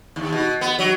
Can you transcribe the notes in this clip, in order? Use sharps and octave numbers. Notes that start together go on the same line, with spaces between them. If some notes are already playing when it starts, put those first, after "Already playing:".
D#2
B2
B3
F#3